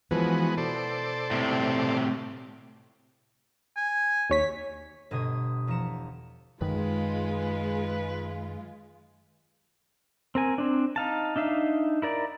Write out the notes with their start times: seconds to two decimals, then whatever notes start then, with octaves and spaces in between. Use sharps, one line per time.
0.11 E3 F3 G#3 B3 F#4
0.57 B2 A4 C5 D5
1.31 A2 C3
3.76 G#5
4.30 D#2 C#5 B6
5.11 G1 B2 D#5 C6 D#6 G#6
5.67 E2 F3 A#5 C#7 E7
6.61 F#2 D#3 G#3 F4 B4
10.35 C4 A#4 G#5
10.58 C4 D4
10.96 D#4 F5 A5
11.36 D4 D#4 E5 F5
12.02 E4 A#4 D5